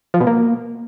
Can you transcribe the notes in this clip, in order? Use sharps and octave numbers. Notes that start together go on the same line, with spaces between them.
F3
B2
A#3